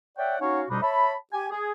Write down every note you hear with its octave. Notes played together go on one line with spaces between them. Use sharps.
C#5 D5 E5 F#5 G5
C#4 D#4 F#4 C#5 F5 F#5
F2 B2 G3 D4 D#4 B5
C#5 E5 A5 B5
G4 G#5
G#4